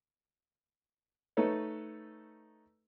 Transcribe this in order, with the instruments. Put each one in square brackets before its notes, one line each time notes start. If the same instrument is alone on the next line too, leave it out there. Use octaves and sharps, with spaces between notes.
[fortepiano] A3 D#4 A4 B4 C#5